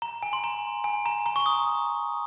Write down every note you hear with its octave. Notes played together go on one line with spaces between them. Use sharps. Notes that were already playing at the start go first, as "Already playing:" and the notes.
A#5
G#5
C6
A#5
G#5
A#5
A#5
C#6
D#6